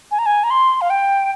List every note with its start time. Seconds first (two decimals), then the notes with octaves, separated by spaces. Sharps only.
0.11 G#5
0.19 A#5
0.26 G#5
0.44 A#5
0.50 C6
0.81 F5
0.90 G5